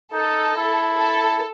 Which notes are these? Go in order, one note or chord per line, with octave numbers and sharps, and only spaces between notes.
D#4 A4
E4
A4